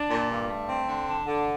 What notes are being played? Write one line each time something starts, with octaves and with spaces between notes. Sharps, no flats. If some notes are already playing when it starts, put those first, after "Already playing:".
Already playing: D4
A#2
G2
A3
C4
D3
D4
D3